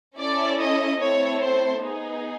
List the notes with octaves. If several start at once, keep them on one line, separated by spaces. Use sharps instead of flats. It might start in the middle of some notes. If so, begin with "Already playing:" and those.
C#4 E4 A4 D5
D#5
A3 C4 E4 A4 C#5
C5
B3 D#4 G#4